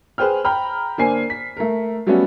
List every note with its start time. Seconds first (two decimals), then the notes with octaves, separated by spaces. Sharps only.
0.18 G#4 B4 C5 G5 F6
0.45 G5 A#5 B5 F6
0.98 D3 A#3 D4 C5 G#5 C7
1.30 B6
1.57 A3 A#4
2.07 F#3 G3 A3 B3 C#4 F#4